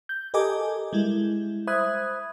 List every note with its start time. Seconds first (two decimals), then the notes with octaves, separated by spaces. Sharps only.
0.09 G6
0.34 G4 A4 A#4 D#5 G#5 D6
0.93 G3 G#3 E4
1.67 C5 E5 B5 D#6 F#6 G#6